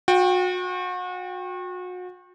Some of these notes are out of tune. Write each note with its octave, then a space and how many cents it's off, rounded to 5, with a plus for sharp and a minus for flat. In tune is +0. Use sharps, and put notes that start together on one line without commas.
F#4 -35 G5 +0